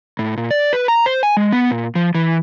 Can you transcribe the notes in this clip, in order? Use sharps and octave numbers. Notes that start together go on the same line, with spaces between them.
A2
A#2
D5
B4
A#5
C5
G#5
G#3
B3
A#2
F3
E3